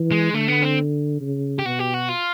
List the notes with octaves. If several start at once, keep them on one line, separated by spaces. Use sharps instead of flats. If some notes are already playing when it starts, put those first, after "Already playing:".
Already playing: E3
G#3
D3 A3
B3
C4
C#3
G4
B2 F#4
G4
F#4
F4